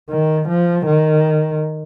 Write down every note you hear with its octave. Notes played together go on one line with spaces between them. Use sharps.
D#3
F3
D#3